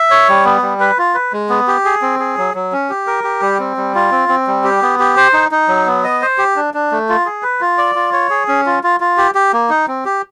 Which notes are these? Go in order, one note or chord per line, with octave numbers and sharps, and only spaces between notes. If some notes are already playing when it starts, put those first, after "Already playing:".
Already playing: E5
C#5
G3
B3
G3
B4
F4
B4
G#3
B3
G4
G#4
C4
G#4
F#3
F#3
C#4
G4
A#4
G4
G3
C4
G3
F4
C4
C4
G3
G4
B3
G4
C5
D#4
D#4
F#3
B3
D#5
C5
G4
D4
D4
A3
F4
G#4
B4
F4
D5
F4
C#5
G#4
C#4
F4
F4
F4
G4
G4
A#3
D#4
C4
G4